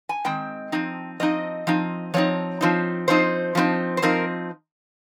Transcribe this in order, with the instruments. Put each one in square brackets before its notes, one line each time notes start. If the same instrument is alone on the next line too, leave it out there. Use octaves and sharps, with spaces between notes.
[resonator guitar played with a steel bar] G#5
D#3 G#3 C4 G5
F3 C4 D#4
F3 C4 D#4 D#5
F3 C4 D#4
F3 C4 D#4 C#5
F3 C4 D#4
F3 C4 D#4 C5
F3 C4 D#4
C5
F3 C4 D#4 A#4